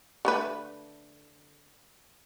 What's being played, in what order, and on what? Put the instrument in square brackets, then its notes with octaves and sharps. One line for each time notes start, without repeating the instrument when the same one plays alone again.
[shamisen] D3 A3 B4